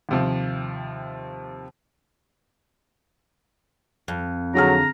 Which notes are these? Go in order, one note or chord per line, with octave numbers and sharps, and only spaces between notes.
D#2 C3 F3
F2
D3 F#3 G#4 A#5 F6